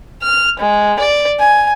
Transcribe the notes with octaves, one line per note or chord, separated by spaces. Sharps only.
F6
G#3
D5
G#5